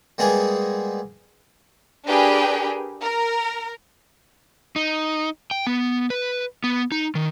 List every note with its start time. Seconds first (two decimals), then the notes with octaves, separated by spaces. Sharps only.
0.18 G3 G#3 A#3 B3 G#4
2.07 D4 G4 G#4 A#4 B4 G5
3.03 A#4
4.76 D#4
5.51 G5
5.67 B3
6.10 B4
6.64 B3
6.92 D#4
7.15 D#3